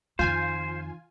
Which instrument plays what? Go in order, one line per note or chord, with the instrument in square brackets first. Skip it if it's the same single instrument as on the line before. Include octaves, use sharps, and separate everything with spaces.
[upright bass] F2 D#3 [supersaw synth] F4 G#5 [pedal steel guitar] C5